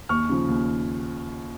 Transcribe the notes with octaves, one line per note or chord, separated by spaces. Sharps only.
D#2 C#6 F6
C#3 F3
D#2